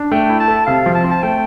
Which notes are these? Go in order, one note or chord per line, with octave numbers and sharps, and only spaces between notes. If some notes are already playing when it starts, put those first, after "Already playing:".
Already playing: D4
A3 G5
E4
A5
A4
C3 F5
F3
A5
C4
A5
A3 G5